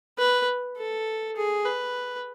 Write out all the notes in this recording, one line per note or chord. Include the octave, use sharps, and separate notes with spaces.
B4
A4
G#4
B4